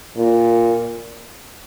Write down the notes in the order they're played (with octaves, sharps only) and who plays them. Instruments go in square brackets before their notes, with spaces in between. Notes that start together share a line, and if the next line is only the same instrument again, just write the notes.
[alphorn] A#2